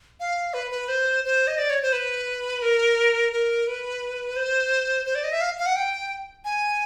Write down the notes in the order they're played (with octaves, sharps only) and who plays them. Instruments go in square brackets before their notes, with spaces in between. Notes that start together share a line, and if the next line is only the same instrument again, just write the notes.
[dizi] F5
B4
B4
C5
C5
D#5
D5
C#5
C5
B4
A#4
A#4
B4
C5
C5
D5
D#5
E5
F5
F5
F#5
G5
G#5